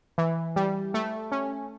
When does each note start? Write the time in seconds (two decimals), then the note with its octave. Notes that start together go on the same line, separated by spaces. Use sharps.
0.18 E3
0.56 G3
0.94 A3
1.32 C#4